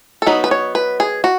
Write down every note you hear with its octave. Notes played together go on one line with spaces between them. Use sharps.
A4
F#3 B3 D#4 B4
B4
C#5
B4
G#4
F#4